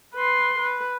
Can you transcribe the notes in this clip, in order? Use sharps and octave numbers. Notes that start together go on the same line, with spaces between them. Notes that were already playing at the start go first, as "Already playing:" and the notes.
B4 C6
B4